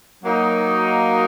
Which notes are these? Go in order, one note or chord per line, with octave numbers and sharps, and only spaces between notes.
F#3 A#3 D#4